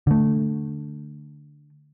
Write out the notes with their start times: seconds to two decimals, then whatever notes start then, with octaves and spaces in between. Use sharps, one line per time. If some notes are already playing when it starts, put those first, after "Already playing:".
0.07 D3 A3